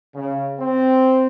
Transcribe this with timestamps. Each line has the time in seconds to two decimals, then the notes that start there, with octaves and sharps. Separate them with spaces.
0.15 C#3
0.59 C4